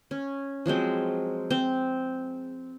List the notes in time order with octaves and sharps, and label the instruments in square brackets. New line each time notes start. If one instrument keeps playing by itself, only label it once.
[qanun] C#4
F3 F#3 G#3 C4
C4